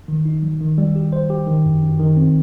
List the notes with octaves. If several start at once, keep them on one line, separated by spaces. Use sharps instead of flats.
D#3
D#4
F#3
D#3
G3
G4
C5
G4
D#3
F#2
F#2
D#3
C4